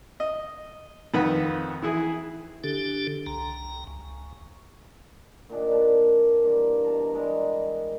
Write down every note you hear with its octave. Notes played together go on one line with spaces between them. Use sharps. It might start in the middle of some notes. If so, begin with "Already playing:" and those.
D#5
F2 D#3 B4 F#5 B5
E3 E4 G#4
D3 D4 G4 A4
C2 A#5
C#2
A#2 D#3 D4 G#4
B4 A5
G2 E3 A#3
B2 A5 A#5
G3 G#3 A#4